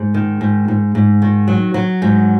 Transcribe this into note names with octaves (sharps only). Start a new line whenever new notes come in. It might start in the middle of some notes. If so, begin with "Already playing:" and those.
Already playing: G#2
D#3
G#2
G#2
G#2
D#3
F#3
F#3
G#2